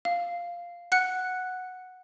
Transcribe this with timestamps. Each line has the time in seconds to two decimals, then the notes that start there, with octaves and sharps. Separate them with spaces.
0.05 F5
0.92 F#5 F#6 C#7